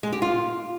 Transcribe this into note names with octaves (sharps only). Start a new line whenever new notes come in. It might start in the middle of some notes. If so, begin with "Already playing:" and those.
G#3
G4
F4